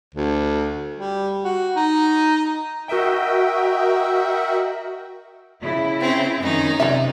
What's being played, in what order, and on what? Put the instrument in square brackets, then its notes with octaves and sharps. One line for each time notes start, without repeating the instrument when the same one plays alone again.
[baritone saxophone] D2
G3
F#4
D#4
[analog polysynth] F#4 A#4 D#5 E5 G5
[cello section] C#3 E4
[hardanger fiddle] C4 C#4
[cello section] F#2 D#3 [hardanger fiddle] C#4 D#4
[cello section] C3 [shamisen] D5 E5